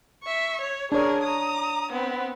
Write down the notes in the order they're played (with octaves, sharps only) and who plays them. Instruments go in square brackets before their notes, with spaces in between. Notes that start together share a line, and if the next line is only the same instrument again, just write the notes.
[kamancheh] E5 C#6
C#5
[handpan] D4 C#5 [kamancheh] G#4 A#4
[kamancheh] A#5 D#6
B3 C4